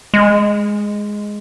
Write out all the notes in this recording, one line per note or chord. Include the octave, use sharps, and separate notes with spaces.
G#3